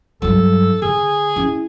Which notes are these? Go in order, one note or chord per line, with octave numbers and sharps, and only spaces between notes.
G2 F#3 A4
D3 G#4
C#4 E4